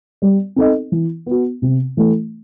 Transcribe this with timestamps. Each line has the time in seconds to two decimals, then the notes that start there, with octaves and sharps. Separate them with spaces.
0.22 G3
0.56 C4 D#4 A4 D#5
0.92 E3
1.26 B3 F#4
1.62 C3
1.97 E3 A3